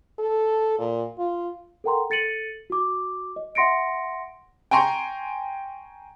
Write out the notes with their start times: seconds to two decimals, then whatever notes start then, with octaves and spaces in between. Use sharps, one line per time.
0.19 A4
0.78 A#2
1.18 F4
1.84 A4 A#4 F#5 G5 A#5 C6
2.10 A4 A6 C#7 D#7 F#7
2.70 F#4 D6
3.36 D#5
3.55 E5 F#5 C6 A#6 C#7 D7
4.71 G5 G#5 A#5 C6 C#6